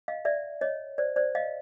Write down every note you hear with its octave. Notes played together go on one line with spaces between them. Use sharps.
D#5 F5
D5 E5
C#5 D#5
C5 D5
C5 D5
D#5 F5